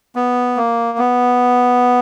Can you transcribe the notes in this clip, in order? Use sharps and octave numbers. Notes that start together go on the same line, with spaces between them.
B3
A#3
B3